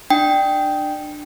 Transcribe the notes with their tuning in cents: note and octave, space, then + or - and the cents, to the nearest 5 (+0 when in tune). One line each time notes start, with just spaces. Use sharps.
D4 +25 G5 -5